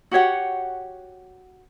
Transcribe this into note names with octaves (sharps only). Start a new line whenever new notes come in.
F#4 G4 C#5 F#5